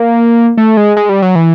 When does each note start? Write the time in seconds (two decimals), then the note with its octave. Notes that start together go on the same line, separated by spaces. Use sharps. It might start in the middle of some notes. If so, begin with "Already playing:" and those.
Already playing: A#3
0.58 A3
0.77 G#3
0.97 G#3
1.09 G3
1.22 F#3
1.35 E3